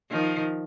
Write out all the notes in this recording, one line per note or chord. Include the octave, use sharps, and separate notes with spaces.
D#3 F3